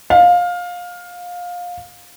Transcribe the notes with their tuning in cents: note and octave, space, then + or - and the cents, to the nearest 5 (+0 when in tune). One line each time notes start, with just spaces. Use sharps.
F5 +20